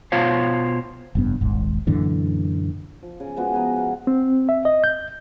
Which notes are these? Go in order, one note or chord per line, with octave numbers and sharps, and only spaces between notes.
B2 F4 C5 C#5 F5
F1 G2 B3
D#1 G#1 G#2
F#2 A#2 D3 E3
F3
C#3
F3 G#3 B3 F#4
G#4 B4 D#5 A#5
F5 F#5 A#5
C4
E5
D#5
G6